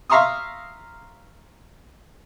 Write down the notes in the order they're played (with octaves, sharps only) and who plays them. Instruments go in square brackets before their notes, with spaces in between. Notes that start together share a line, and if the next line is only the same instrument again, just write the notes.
[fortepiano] E5 F5 A#5 C6 C#6 D#6